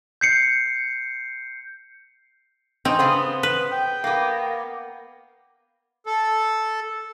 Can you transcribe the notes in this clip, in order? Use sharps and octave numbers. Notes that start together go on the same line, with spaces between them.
G6 C7 C#7
C4 C#4 D#4
C#3 B3 C5
B4
G5
A#3 B3
A4